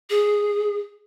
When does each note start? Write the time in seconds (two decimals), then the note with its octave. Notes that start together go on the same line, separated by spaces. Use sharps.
0.10 G#4